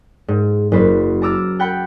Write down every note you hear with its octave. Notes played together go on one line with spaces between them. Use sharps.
G#2
F#1 B4 C5 B6
A5 A#5 D6 E6 F6 A6
F#5 G5 A5 B5 G6 C#7